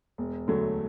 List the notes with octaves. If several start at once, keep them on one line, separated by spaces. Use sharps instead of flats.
E1
D2 D3 F#3 A3